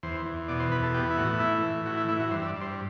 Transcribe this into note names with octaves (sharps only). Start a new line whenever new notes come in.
E2 C5
E2
B2 D5
C5
E2 B4
A4
B3 G4
E4
A2 F#4
E3 E4
A2
E3 F#4
E4
E3 E4
F#4
G2 C5
E5
D5
G2
C5